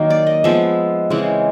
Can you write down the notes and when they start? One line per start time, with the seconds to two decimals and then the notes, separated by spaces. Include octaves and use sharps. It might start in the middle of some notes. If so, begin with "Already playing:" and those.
Already playing: D#3 F#3 A#3
0.10 D5
0.27 D#5
0.44 F3 G#3 B3 E5
1.10 C#3 E3 G#3 C4 F#5